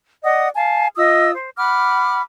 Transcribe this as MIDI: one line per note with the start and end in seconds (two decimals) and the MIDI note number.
0.24 0.49 74
0.24 0.49 75
0.24 0.49 78
0.24 0.49 87
0.56 0.87 77
0.56 0.87 80
0.56 0.87 81
0.97 1.31 65
0.97 1.31 75
0.97 1.31 87
0.97 1.31 88
1.34 1.50 72
1.57 2.21 78
1.57 2.21 83
1.57 2.21 86
1.57 2.21 89